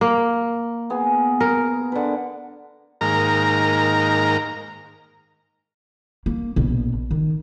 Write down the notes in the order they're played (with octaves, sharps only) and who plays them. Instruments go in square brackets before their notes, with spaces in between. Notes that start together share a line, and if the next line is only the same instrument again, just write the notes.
[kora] A#3
[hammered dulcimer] B3 G#4
[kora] A#4
[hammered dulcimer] D3 B4
[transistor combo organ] G#2 D#3 A#3 A#4 A#5
[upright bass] A#3
A#1 B2
D#3